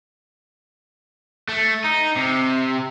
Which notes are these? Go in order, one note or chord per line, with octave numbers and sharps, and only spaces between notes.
A3
D#4
C3